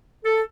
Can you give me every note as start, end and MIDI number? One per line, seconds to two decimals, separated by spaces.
0.25 0.40 69